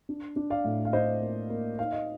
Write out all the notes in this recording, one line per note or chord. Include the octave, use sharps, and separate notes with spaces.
D4
D4
D5 F5
A2
F5
D4 C5 D#5
A#3
A#3
D#4 F5
D#5